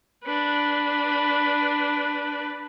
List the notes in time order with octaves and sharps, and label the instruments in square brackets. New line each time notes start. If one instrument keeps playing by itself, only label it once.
[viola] D4 B4